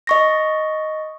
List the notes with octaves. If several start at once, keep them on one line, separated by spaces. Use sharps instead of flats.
D#5 C#6 A#6